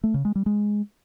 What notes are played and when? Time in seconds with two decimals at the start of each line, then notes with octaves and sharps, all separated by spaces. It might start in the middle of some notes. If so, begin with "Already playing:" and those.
0.04 A3
0.14 C#3
0.25 G#3
0.35 G3
0.46 G#3